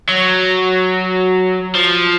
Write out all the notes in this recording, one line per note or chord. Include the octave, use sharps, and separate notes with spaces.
F#3
F3